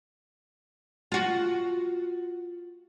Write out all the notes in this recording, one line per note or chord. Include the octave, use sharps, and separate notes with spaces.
F4 F#4